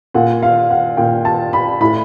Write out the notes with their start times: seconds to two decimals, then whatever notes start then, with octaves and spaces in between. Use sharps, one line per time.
0.14 A#2 F#5
0.43 F5
0.70 F#5
0.97 A#2 G5
1.25 A5
1.53 B5
1.81 A2 B5